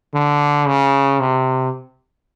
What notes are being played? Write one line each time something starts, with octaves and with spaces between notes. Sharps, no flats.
D3
C#3
C3